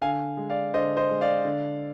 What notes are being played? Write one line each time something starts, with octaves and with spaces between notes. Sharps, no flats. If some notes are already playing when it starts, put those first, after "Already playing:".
D3 F5 G#5
G#3
D5 F5
D3 C5 D#5
C5 D#5
G#3
D5 F5
D3